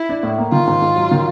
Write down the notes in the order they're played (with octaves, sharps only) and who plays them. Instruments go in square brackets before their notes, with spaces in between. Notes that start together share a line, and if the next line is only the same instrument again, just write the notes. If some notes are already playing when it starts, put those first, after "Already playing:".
Already playing: [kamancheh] E4
[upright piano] D4
A2
A#3
[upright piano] D#3 [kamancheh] F4
[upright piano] G#2
G#2
F#3
D#3